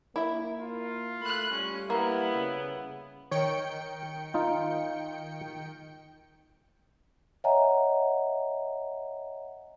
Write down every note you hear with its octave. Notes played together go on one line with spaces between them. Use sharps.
A#3 E4 E5
F4
A3 B5 F#6
G3 C#4
A#3 B3 E4
C#3
D#3 C#5 G5 C#7
D#4 F4
C#5 D#5 E5 F#5 G#5 A#5